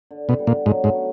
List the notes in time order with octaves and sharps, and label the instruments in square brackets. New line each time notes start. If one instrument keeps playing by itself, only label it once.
[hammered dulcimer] D3
[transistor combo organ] B2
[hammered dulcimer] G3 B3
[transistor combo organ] A#2
[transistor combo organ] G#2 [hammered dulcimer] F#3
[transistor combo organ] G#2
[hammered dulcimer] A3 C#4